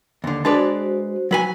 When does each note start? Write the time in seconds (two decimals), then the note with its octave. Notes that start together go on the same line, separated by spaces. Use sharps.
0.24 D#2 D3
0.45 G#3 D4 F#4 G#4 B4 C5 D5
1.31 F#3 B4 G#5